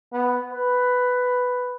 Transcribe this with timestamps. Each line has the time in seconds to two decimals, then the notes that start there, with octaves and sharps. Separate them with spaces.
0.13 B3
0.51 B4